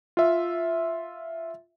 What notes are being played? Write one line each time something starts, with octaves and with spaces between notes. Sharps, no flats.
F4 E5